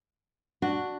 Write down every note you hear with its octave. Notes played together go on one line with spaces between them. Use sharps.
D4 F#4